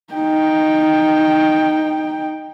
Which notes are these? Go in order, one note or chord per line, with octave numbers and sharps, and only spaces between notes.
D#4 G5